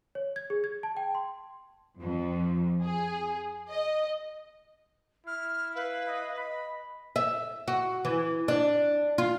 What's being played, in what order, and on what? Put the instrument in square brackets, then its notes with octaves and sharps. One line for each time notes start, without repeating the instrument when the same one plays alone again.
[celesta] C#5
G#6
G#4
G#6
A5
G5
C6
[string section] F2
G#4
D#5
[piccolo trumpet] E4 [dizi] F6
[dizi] B4 [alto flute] F5
[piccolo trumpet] D#5
[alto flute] D#5 [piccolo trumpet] B5
[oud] E5
F#4
E3
D4
F4